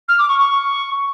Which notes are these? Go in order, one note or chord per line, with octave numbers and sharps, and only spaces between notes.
F6
D6
C#6
C#6